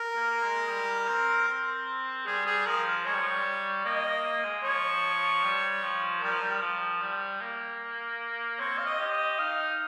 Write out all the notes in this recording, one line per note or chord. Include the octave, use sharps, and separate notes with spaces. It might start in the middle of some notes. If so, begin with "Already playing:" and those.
Already playing: A#4
A#3
G#3
G3
C4
C4
G3 G#4
G#4
F3 A#4
G#3 C#5
G3
F3
G3
A#3 D#5
A#3
A#3
G#3
F3 C#5
G3
F3
G3 A#4
F3
G3
F3
G3
A#3
C4 C#5
F5
D#5
G4
D#5
D#4 F5